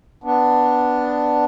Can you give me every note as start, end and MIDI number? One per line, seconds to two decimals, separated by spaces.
0.24 1.45 59
0.24 1.45 62